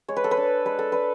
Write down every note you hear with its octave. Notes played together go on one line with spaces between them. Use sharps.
G#3 C#5
B4
A4
B4
D4
G#3 B4
A4
D4 B4